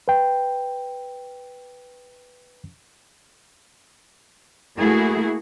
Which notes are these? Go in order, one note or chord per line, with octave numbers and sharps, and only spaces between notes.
B4 G5
A3 A#3 E4 F#4 G#4